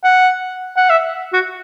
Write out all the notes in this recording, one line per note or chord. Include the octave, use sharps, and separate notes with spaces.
F#5
F#5
E5
F#4